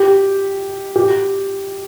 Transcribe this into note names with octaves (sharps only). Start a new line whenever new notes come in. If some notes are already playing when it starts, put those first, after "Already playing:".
Already playing: G4
G4